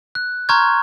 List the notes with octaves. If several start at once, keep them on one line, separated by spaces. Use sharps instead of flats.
F#6
A#5 C6 C#6 F6 G6 G#6